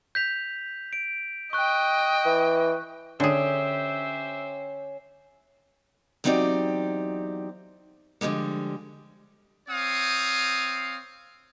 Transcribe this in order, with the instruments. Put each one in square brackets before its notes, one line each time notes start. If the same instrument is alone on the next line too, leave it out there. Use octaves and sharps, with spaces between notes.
[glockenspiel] G6 B6 F7
D7
[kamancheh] D#5 G5 [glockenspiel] C#6 F#6
[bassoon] E3
[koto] D3 G#4 [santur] C#4 [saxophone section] G4 C5 E5
[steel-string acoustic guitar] E2 F#3 C4 D#4 G4 D5
D3 F3 G3 G#3 A#3
[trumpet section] C4 C#5 F5 D#6